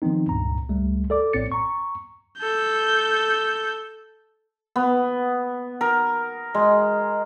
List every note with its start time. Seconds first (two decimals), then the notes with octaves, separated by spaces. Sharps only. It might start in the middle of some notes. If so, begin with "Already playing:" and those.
0.02 D#3 F3 B3 C4 D#4
0.29 C#2 G2 A#2 A#5
0.69 C#2 G3 A3
1.10 A4 D5 D6
1.33 A#1 A2 C4 C#5 A6 C#7
1.52 A#5 C#6
2.39 A4 G6
4.76 B3
5.81 A#4
6.55 G#3